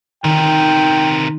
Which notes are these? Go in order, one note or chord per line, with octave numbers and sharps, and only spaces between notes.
C3 D#3 A#4 G5